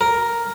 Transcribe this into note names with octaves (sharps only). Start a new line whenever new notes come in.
A#4